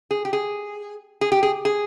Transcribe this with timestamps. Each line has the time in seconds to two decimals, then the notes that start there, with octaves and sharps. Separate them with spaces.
0.11 G#4
0.25 G4
0.33 G#4
1.21 G#4
1.32 G4
1.43 G#4
1.65 G#4